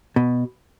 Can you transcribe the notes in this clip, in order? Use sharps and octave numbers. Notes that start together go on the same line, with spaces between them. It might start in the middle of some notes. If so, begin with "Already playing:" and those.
B2